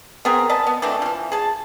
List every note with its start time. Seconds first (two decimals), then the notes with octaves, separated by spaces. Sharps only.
0.25 B3 C4 G#4 A#4
0.49 B4 D#5 A5
0.67 B3
0.82 E3 A3 C4 D4
1.02 E3 F3
1.32 G#4 A5